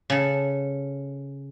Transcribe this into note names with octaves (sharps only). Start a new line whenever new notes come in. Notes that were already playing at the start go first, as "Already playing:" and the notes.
C#3 A4